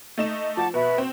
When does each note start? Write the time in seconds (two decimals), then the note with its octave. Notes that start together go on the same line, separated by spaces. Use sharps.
0.18 A3 D#4 E7
0.57 F3 F#5 A5 D6
0.74 B2 B4 E5
0.98 C4